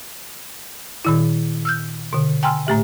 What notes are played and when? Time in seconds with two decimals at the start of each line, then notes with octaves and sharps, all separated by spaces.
1.05 A#2 D#3 E4
1.65 E6 F6 G6
2.13 B2 D3
2.43 G5 G#5 A#5 C6 E6 F6
2.67 A2 A3 G4 E5